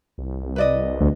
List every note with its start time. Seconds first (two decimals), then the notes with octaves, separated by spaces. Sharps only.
0.18 C2
0.56 B4 D5 D#5
1.00 D2